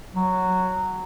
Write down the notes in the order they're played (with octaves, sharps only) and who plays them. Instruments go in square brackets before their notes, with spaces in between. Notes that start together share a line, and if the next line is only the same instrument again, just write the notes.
[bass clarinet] F#3